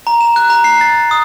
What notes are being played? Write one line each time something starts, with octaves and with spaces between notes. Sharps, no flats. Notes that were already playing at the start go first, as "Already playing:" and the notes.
A#5
E7
F#6
A#5
C7
A6
D#6